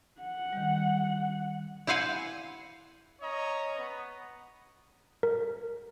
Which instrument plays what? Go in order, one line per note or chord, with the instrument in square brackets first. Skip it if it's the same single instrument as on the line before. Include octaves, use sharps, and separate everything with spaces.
[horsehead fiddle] F#5
[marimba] D#3 G3
[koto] E4 C5 F5 F#5 G#5
[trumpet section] C#4 C#5 D#5 A#5
B3
[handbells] A#4